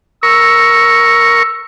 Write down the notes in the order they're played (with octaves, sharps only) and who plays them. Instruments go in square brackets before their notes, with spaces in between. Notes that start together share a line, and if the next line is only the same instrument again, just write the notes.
[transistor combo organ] A#4 C#6 [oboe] E6